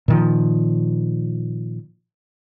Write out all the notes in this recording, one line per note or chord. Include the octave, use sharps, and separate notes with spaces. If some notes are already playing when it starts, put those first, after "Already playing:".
A#2 D#3 F3